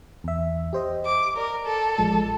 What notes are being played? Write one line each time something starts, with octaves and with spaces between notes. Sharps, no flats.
E2 E5
G4 C5 D#5
D6
A#4 D5
A4
A1 F3 G#3